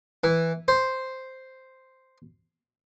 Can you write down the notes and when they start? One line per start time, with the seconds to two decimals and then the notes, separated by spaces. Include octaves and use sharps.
0.24 E3
0.68 C5